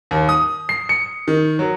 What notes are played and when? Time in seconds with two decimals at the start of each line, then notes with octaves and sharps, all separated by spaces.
0.11 D#2
0.29 D#6
0.69 C7
0.89 C#7
1.28 D#3
1.59 F#3